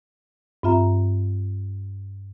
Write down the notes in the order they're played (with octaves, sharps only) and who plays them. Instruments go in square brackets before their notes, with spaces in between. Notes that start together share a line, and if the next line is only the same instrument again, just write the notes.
[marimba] G2 C4 F4 E5 A#5